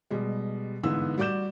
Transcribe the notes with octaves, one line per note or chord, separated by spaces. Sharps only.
B2 G3 G#3
G1 G#2 E3 B3 B4 E6
G3 F#4 D5 D6 G6 E7